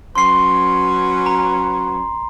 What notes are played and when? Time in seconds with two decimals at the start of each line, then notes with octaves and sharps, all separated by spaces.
0.15 F#3 C#4 B4 C6 C7
1.26 A#5